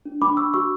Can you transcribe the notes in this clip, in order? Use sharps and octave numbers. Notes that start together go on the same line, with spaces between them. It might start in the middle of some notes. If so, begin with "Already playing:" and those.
D4
D4 B5 D6
D4 C#6 E6
F#4 C#6 E6